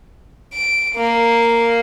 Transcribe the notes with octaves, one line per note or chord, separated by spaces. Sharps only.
D7
A#3